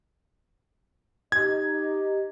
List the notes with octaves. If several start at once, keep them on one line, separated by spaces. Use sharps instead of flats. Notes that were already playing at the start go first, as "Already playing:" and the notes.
D#4 G4 D#5 G#6